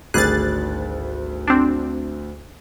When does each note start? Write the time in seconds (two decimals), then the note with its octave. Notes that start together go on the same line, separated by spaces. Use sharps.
0.14 G#1 D2 G3 G#4 F#6 A6
1.47 C4 D4